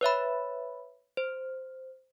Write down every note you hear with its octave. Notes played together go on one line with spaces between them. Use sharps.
B4 C#5 E5 B5
C5